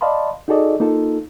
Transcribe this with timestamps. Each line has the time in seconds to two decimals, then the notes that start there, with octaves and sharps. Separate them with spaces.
0.01 D5 D#5 F5 A5 B5 C6
0.48 D#4 F#4 G#4 A4 D5 D#5
0.80 A#3 D#4 F4 A4